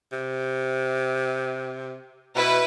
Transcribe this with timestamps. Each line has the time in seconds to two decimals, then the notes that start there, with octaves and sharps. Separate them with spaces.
0.12 C3
2.36 B2 E4 B4